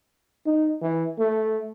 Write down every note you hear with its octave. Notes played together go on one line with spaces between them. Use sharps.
D#4
E3
A3